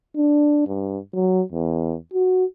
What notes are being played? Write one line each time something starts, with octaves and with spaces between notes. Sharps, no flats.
D4
G2
F#3
E2
F#4